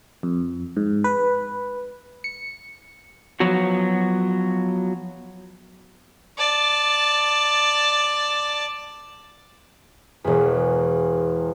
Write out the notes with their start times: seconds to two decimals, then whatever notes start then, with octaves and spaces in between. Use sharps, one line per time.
0.23 F2
0.77 G#2
1.04 B4
2.24 C#7
3.40 F3 F#3 B3 F#4
6.37 D5 A5
10.24 E1 E2